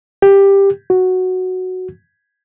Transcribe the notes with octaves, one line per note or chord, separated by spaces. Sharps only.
G4
F#4